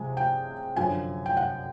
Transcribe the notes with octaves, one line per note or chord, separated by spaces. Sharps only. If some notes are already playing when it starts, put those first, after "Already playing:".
Already playing: C3 F3 G#3 G#5
G5
F#2 D3 F3 G#5
G5
F#5